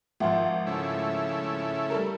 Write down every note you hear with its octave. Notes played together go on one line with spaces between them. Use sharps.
G#1 F3 E5 F#5 C6
C#3 A3 E4
G3 A4 A#4